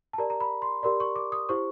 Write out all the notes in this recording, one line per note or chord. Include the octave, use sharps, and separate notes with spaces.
A5
G4 A#4 D5 A#5
A#5
B5
C6
G4 A#4 D5 C6
C#6
D6
D#6
E4 G4 C5 C#6